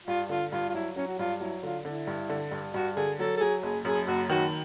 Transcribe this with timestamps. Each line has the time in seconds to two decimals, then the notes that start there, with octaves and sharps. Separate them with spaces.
0.07 G2 F4
0.29 D3 F4
0.51 G2 F4
0.69 F4
0.73 F#3 E4
0.96 F#3 C#4
1.07 F#4
1.19 G2 F4
1.40 F#3 E4
1.63 D3 F4
1.85 D3 E4
2.07 G2
2.29 D3
2.51 G2
2.74 G2 F#4
2.96 D3 G#4
3.18 F#3 A4
3.37 A4
3.40 F#3 G#4
3.63 F#1 G#4
3.85 F#2 G#4
4.07 F#1 F#4
4.29 D#3 F#4